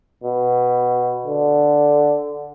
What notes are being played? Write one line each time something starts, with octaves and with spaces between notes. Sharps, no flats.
B2
D3